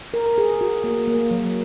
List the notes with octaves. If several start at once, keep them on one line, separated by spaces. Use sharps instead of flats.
A#4
A#4
G#4
F#4
A#3
A#3
F#3